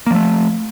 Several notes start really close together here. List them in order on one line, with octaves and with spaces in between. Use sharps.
A#3 F3 A3